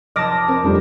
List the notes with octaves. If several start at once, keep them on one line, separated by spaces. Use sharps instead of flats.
F1 D#5 A5 C6 D6 F6 A#6
C4 A#4
F2 F3 G3 A3 D4 G4